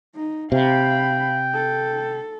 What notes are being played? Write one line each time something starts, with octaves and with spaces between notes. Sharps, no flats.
D#4
C3 F5 G5 B5
A4